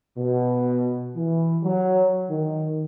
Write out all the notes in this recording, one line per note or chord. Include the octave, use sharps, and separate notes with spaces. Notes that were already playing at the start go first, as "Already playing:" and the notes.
B2
E3
F#3
D#3